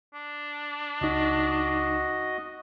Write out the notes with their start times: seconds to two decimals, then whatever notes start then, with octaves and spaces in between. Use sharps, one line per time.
0.14 D4
1.01 C#2 D#4 F#4 D#5